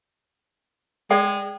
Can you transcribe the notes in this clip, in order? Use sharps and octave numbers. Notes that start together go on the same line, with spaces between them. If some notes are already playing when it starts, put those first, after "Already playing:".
G#3 A4 D5 G5